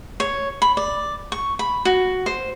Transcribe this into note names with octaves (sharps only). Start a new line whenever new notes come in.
C#5
B5
D5
C#6
B5
F#4
C5